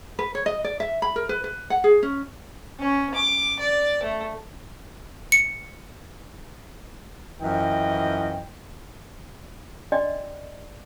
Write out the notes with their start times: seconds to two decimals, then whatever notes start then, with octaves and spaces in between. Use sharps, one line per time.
0.19 B4
0.35 C#5
0.46 D#5
0.64 D5
0.80 E5
1.02 B5
1.16 A#4
1.29 B4
1.44 B4
1.70 F#5
1.84 G#4
2.03 C#4
2.80 C#4
3.14 D6
3.59 D5
4.03 A3
5.32 C#7
7.42 F#2 E3 F3 D#5 G5
9.92 D4 F#4 D5 D#5 G5